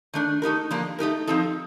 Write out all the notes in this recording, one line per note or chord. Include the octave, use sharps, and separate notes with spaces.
D#3 A3 D4
A3 D#4 G4 A#4
D3 F3 A#3 D4
A3 D#4 G4 A#4
F3 C4 D#4 A4